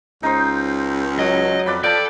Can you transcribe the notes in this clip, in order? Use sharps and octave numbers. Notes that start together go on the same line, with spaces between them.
C#2 D#4 C5
F#3 D#5
F2 B4 D5 B5
F3 A4 D5 G5 A5